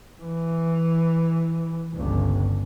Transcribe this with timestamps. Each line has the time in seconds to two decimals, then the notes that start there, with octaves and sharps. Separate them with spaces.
0.23 E3
1.95 G1 C#2